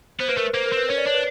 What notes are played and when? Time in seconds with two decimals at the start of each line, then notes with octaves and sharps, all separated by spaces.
0.20 B3 C5
0.29 A#3 B4
0.37 A3 A#4
0.46 B4
0.54 A#3 C5
0.66 A#4
0.72 C4 B4
0.89 C#4 C#5
0.98 D5
1.07 D4 C#5
1.15 B4